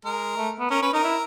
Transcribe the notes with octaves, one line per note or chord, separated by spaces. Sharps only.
G#3 A#4
A3
B3
C#4 A#4
C#4 B4
D#4 A#4
E4